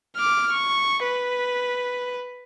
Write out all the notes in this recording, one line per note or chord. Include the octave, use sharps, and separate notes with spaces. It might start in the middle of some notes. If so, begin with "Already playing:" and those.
D6 F6
C#6
B4